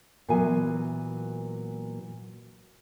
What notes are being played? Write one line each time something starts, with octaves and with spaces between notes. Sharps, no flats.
A#2 E3 F#3 B3 G#5